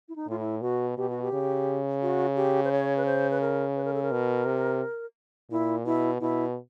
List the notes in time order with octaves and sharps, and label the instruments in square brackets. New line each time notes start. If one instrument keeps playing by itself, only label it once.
[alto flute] E4
D#4
[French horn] A2 [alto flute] F4
[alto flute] E4
[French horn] B2 [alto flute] F#4
[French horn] B2 [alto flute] G4
[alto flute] F#4
G4
[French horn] C#3
[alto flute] F#4
G4
C5
C#5
B4
C5
B4
A#4
B4
A#4
A4
A#4
[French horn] B2
C3
[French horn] A#2 [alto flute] E4
[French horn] B2 [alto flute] E4
[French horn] B2 [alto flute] E4